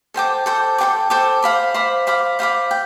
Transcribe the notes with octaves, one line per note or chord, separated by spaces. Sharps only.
A4 C5 G5 D6
A4 C5 G5 D6
A4 C5 G5 D6
A4 C5 G5 D6
C5 F5 B5 D6
C5 F5 B5 D6
C5 F5 B5 D6
C5 F5 B5 D6
G5